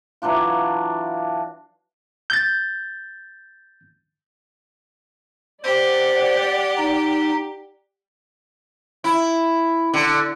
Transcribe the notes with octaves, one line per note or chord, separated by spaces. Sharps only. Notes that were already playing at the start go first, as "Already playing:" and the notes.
E3 F#3 D4 F4
G6 A6
G4 C5 D5 F#5
D#4
E4
D3